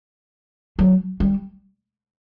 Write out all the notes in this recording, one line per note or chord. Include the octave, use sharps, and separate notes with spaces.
F#3
G3